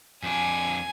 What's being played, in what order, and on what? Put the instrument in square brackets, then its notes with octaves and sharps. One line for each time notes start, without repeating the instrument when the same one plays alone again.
[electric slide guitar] F2 D4 [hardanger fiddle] G#5